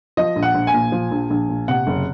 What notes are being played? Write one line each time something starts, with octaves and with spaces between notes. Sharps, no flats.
F3 D#5
A#1
F#5
A#1
G#5
A#2
F3
A#1
A#1
A#2
C3 F#5
F#1